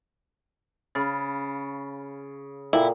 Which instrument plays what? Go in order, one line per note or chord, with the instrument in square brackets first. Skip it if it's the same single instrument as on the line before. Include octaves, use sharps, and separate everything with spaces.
[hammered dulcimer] C#3 [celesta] B5 F6 A6
[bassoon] A#2 [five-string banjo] E4 [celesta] A4 F5 G5